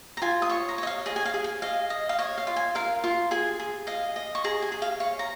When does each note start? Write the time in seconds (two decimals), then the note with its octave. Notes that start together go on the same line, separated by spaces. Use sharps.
0.17 A#5
0.22 F4 G#5
0.42 D#6
0.49 C#5 C#6
0.69 A#5
0.78 C#5 D#5
0.87 F5
1.06 G#4 D#5
1.16 G#5
1.26 F5
1.34 G#4
1.44 G#5
1.62 D#5 F5
1.90 D#5
2.09 F5
2.19 C#5 D#5
2.38 F5
2.47 F4
2.56 G#5
2.75 A#4 F5
3.04 F4
3.31 G#4 G#5
3.59 G#4
3.87 D#5 F5
4.16 D#5
4.35 C#6
4.44 G#4 A#5
4.62 G#5
4.72 G#4
4.82 F5
5.00 C#5 F5
5.19 A#5